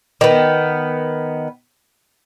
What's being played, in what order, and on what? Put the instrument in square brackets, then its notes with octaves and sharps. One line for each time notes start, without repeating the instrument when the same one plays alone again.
[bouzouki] D#3 B3